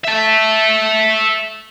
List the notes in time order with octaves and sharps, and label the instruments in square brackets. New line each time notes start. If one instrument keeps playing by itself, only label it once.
[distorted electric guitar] E5 A5